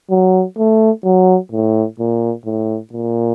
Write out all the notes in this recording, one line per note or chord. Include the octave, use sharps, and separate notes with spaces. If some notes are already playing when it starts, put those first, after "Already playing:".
F#3
A3
F#3
A2
A#2
A2
A#2